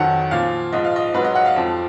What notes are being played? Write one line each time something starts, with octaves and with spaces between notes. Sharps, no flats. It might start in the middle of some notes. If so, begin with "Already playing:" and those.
Already playing: F2 D#3 F#3 F#5
A#2 F3 F5
G#2 F3 D#5
F5
D#5
G#2 F#3 B4
D#5
F#5
F5
F2 F3